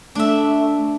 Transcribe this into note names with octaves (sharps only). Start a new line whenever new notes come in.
A3 D4 E5